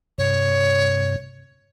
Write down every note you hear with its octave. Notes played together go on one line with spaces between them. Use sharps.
G2 C3 C#5